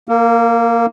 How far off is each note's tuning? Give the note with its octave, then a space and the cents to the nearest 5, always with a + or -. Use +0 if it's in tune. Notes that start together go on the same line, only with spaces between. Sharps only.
A#3 +0 A#4 -40